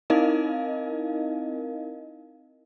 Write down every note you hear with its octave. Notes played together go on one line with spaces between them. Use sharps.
C4 D#4 E4 A#4 D#5 F5